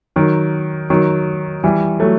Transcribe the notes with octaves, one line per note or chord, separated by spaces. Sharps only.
D#3 F#3
D#3 F#3
E3 G3
F#3 A3